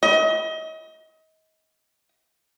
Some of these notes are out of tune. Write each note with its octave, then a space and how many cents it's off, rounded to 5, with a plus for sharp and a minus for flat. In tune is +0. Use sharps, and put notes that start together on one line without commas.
D#5 +35